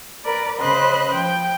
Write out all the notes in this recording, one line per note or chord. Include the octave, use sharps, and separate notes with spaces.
A#4 B4 D5
C#3 B4 C5 D#5 C6 F#6
F3 G5